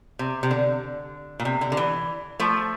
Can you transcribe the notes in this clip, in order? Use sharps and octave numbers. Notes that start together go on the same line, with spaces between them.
C3
C3
D3
A#2
C3
D3
D3
E3
F3 A3